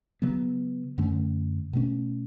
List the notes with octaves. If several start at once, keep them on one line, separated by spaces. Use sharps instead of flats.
C#3 F#3 B3
F#2 D3 A3 C#4
B2 A3 C#4